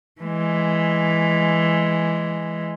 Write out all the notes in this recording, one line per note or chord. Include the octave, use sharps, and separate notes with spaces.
E3 G#3